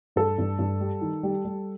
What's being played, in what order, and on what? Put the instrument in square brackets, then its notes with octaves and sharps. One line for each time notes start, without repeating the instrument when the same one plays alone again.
[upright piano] G2 A4
G2
G2
G3
D#3
G3
G3